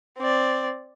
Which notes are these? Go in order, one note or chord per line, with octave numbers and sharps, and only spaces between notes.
C4 D5